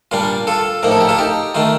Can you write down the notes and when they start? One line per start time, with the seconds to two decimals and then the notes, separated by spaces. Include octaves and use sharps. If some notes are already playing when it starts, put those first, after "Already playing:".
0.11 A#2 G3 D4 F4
0.47 F4 A4
0.83 A2 F3 A#3 D#4 A#4
0.91 A4
1.01 G4
1.09 F4 A4
1.18 D#4 G4
1.55 D#3 A3 D#4 F4